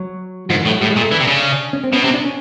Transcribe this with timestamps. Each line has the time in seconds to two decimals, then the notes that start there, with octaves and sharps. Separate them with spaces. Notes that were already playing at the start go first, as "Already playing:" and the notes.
Already playing: F#3
0.50 G#2 F3
0.56 D#3
0.60 E3
0.66 A2
0.71 F#3
0.81 A2 G3
0.91 G#3
0.96 A#2
1.01 A3
1.11 E3 D4
1.20 C3
1.27 C#3
1.73 C#4
1.84 C4
1.93 B2 C#4
2.04 C3 C#4
2.14 D4
2.24 C#4